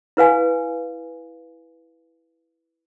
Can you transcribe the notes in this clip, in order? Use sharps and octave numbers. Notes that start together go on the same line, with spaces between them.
E4 B4 F5 G#5